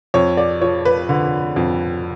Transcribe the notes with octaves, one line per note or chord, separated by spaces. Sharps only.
F2 C#5
D5
F3 C#5
B4
D3
F2